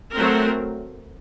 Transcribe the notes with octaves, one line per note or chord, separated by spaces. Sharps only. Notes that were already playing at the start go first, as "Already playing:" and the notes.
F#3 A3 C4 A#4